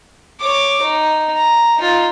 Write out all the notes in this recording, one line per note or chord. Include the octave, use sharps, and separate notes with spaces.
C#5 D6
D#4
A#5
D#4 F4